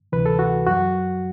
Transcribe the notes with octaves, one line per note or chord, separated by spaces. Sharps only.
D2 C3 E3 B4
A4
F#4
F#2 F#3 F#4